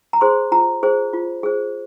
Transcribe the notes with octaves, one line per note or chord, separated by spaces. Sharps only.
A#5
G#4 C5 C6
F4 A#5
G#4 C5
F4
G#4 C5